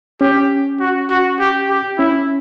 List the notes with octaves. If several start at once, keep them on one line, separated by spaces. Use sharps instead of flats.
C#4 G4
F#4
F#4
G4
G4
C#4 E4